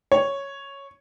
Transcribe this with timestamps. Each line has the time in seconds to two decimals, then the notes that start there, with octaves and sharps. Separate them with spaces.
0.12 C#5